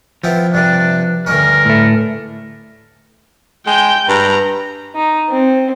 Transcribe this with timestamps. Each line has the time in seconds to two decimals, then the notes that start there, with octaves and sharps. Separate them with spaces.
0.24 F3 B3 C4 E4
0.54 G2 C3 D4
1.26 D2 G2 C#4 A#4
1.65 A2 A3
3.67 G#3 G5 G6
4.09 G2 A#5
4.95 D#4
5.29 C4